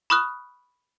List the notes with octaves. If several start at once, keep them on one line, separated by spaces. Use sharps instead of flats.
B5 C#6 D#6 F6 F#6